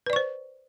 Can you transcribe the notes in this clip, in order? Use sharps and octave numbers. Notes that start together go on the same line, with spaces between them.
B4 C5 D5 C#6